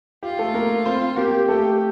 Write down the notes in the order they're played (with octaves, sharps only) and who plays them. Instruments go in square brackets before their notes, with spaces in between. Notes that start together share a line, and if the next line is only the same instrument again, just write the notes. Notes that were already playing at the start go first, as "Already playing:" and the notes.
[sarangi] F4 [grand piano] G4
[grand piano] A3 A4
A#3 A#4
C4 C5
[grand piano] A#3 A#4 [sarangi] G4
[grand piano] A3 A4 [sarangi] G4